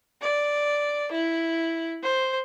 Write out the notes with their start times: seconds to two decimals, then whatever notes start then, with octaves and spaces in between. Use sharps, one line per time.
0.22 D5
1.11 E4
2.03 C5